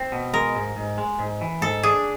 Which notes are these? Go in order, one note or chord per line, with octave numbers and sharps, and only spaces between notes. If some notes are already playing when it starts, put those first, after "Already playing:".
Already playing: C4
B2
G#3 A#4
G#2
G#2
G#3
G#2
E3
G#2 A4
D4 G#4